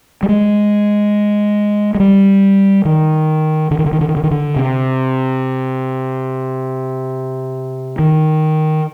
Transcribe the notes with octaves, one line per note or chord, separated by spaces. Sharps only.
G3
G#3
G#3
G3
D#3
D3
D#3
D3
D#3
D3
D#3
D3
D#3
D3
C3
D#3